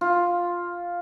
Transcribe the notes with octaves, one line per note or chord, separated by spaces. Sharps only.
F4